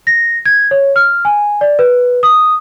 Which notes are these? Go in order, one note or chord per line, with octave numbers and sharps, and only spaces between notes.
A#6
G#6
C#5
F6
G#5
D5
B4
D#6